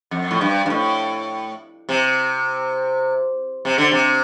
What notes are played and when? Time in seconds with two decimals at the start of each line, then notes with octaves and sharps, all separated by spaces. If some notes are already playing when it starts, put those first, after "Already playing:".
0.11 F2
0.31 A2
0.41 G2
0.66 G2
0.70 A2
1.89 C3
3.65 C3
3.78 D3
3.91 C3